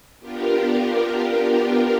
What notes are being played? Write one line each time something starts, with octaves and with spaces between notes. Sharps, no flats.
B3 D4 F4 G4 A#4